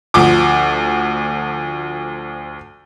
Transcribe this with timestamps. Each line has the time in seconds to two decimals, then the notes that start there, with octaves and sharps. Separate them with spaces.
0.14 D2 F3 D6